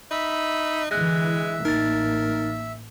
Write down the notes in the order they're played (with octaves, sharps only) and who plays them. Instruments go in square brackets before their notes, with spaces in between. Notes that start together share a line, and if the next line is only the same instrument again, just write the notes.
[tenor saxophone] D#4 [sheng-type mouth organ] E5 B5
[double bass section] D3 E3 [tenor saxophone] G#3 [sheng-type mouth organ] E5 [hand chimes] F#6 A#6
[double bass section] A1 A#3 [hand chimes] D#4 A6 [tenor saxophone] A#4